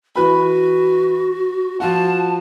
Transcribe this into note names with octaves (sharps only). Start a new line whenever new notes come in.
E3 F#4 B4 B5
F3 F4 F#4 A5